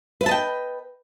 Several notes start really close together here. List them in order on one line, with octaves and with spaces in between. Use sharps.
B4 E5 A5 D#5 G5